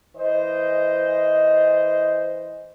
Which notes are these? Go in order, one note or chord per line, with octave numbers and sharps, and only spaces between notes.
E3 C5 D#5